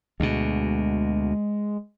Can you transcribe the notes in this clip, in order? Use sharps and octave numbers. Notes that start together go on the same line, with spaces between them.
D2 B2 G#3